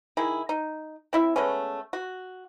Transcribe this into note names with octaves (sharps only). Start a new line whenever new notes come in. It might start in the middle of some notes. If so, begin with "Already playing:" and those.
D#3 E4 G#4
D#4
C4 E4 E5
G#3 A3 B3 C#4
F#4